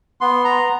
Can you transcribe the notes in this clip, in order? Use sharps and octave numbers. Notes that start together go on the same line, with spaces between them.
B3 C6
A#5